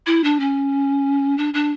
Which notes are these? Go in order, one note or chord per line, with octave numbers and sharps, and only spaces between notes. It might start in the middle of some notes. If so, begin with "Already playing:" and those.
E4
D4
C#4
D4
D4